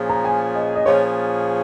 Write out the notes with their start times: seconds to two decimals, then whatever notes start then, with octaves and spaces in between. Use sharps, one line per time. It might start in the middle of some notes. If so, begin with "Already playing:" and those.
Already playing: A#2 F3 C#4 G#4
0.09 A#5
0.24 G#5
0.55 D#5
0.76 D#5
0.86 A#2 F3 C#4 G#4 C#5